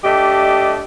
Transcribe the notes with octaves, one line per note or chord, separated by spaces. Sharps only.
A3 D4 G4 D#5